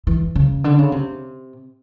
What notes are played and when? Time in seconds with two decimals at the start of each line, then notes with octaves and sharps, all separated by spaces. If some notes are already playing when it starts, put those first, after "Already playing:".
0.07 E3
0.35 C#3
0.64 D3
0.78 C#3
0.92 C3